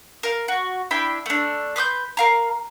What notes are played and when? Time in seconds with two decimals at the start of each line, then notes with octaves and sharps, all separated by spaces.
0.23 A#4 F5
0.48 F#4
0.91 D4 E4 G5 B5
1.26 A3 D4
1.76 B4 C6 D#6 G6
2.17 A#4 F5 A#5